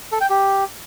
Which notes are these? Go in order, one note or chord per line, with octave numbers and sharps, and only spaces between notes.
A4
G5
G4